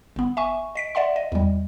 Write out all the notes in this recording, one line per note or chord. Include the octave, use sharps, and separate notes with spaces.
G1 B3
E5 G#5 C#6
D#5 B6 D7
D5 E5 F#5 C6
D#5
E2 G3